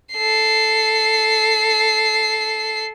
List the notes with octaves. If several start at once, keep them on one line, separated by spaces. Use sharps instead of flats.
A4 C7